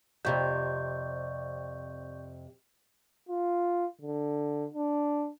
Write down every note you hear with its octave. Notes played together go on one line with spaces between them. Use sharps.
F2 C3 D5 C#6 G6
F4
D3
D4